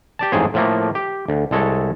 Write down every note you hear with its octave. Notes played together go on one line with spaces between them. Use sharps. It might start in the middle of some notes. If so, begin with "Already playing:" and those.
G4 D5 A5
A1 F2 G#2 G#4 C5 C#5
A2 F3 A3 A#3
G4
D2
C2 G#3 A4 C#5